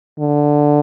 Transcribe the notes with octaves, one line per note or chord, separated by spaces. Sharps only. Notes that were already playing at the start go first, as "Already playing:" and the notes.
D3